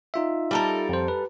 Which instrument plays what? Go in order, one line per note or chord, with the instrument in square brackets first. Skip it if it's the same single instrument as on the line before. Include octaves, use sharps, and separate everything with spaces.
[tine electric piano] D#4 F4 E5
[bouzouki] G3 A4 A#4
[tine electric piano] F2 C5
B4